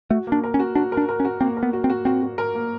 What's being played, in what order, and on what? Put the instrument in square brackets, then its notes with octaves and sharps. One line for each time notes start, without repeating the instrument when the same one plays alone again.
[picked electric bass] A3 [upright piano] F#4
[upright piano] A#3
[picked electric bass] D4
[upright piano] A#4
[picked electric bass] C#4
[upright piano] F#4
[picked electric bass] D4 [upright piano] F#4
[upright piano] A#4
[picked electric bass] D4
[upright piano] A#4
[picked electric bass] C#4
[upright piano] F#4
[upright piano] A#3 [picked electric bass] C4
[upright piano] A#4
[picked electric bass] B3
[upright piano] F#4
[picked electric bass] C4
[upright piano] F#4
[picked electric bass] C4 [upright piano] F#4
[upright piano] F#4
A#4
A#3